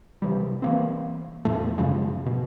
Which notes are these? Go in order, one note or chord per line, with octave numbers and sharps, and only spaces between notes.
C3 E3 G3
E3 A#3 C4
E2 A2 F3 A3
F#2 C#3 F3 G#3
B2